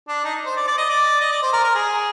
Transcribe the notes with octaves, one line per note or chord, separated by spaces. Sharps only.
D4
D#4
C5
D5
D5
D#5
D5
D#5
D5
C5
A#4
A#4
G#4